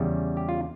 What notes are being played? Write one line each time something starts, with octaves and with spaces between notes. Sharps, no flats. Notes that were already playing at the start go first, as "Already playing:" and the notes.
Already playing: E2 C#3 G3
G4
F4